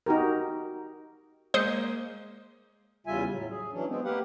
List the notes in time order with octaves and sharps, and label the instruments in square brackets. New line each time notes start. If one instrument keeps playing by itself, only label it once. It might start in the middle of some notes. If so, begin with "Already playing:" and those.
[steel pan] D#4 F#4 G4 A#4
[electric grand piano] G#3 A#3 D#5 [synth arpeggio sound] C5 D#6 C#7
[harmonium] E2 C#3 G3 F4 E5 G#5
A2 F#3
G#4
E3 F#3 C#4 D4
G#3 B3 C4
A#3 G4 B4 F5 F#5